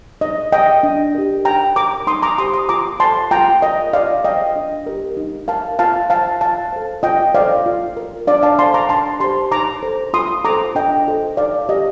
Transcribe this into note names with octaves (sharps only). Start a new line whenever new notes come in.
D#4 D#5
A#4 D#5 G5
D4
G4 A#4
D#4 G5 A#5
A#4 A#5 D6
D#4 C6 D#6
A#5 D6
G4 C5 C6 D#6
C6 D#6
F4 A#5 D6
A4 C5 A5 C6
F4 G5 A#5
A#4 D#5
F4 D5 F5
C5 D#5 G5
D4
G4 A#4
D#4
A#4 F5 A5
F4 F5 A5
C5 F5 A5
F4 F5 A5
A4 C5
F4 D#5 G5
A4 C5 D5 F5
F4
A#4
D4 D5 F5
F5 A5
A4 C5 A5 C6
A#5 D6
D4 A5 C6
G4 C5 A5 C6
D#4 A#5 D6
A4 C5
F4 C6 D#6
A4 C5 A#5 D6
D4 D#5 G5
F4 A4 C5
D#4 D5 F5
G4 A#4 D#5